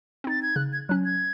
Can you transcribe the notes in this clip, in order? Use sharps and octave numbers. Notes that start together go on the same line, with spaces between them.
C4 D#4 A6
G#6
C#3 F#6
G#6
F#3 C#4 F#6
G#6